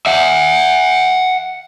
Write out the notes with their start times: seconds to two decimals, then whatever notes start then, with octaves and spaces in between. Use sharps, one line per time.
0.06 E5 F#5